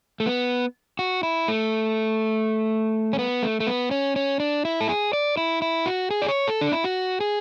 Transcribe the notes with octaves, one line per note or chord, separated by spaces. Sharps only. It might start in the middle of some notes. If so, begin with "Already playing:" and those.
A3
B3
F#4
E4
A3
C#4
B3
A3
A3
B3
C#4
C#4
D4
E4
A4
G#4
D5
E4
E4
F#4
G#4
D5
C#5
A4
D4
E4
F#4
G#4